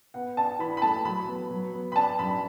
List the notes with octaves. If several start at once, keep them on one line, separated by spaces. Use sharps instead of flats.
B3 F#5
D4 A5
E3 B5
B5
A3 A5
F#3 B5
B3
F#3
B3
B5
D4 A5
F#2 B5